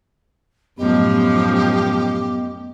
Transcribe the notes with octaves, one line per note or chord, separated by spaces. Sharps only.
F#2 A2 F3 B3 G4 D#5